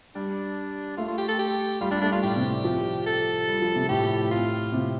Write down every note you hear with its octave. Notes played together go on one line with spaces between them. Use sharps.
G3 D4
A3 F4
F4
G4
A4
G4
G3 F4
G3 D4
A3 D4
G3 F4
A2 G4
C3
F3
A4
G3
F3
C3
A2 G4
F4
C3